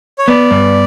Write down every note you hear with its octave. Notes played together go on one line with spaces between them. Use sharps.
C#5
B3 D5
G2